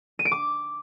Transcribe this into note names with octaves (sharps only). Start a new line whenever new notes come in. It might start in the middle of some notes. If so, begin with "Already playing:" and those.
D#7
D7
D6